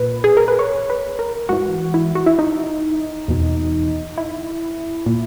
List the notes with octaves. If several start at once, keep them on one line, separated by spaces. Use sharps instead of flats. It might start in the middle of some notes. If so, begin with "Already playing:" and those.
Already playing: A#2 B4
G#4
A#4
B4
C#5
B4
A#4
G#2 E3 F#4
E4
F#4
E4
D#4
E2 B2
E4
A#2